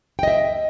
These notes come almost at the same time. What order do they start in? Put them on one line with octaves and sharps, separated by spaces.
G5 D#5 E5